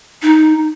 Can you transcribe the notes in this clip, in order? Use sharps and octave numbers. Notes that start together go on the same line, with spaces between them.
D#4